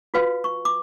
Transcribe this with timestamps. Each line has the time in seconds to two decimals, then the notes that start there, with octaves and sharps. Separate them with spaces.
0.14 F4 F#4 B4 F5 G5
0.44 C#6
0.65 D6